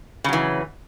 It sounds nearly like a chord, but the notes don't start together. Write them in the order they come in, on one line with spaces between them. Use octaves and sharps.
C#3 F#3 E3